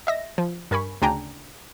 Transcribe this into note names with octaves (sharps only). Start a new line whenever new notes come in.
D#5 E5 A#6
F3
G2 A#4 G#5 B5 C#6
D2 C#3 D4 G5 G#5 A#5